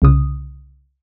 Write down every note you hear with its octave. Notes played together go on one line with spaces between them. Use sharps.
C2 C#3 D#6